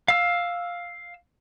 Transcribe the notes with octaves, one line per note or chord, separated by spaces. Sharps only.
F5 E6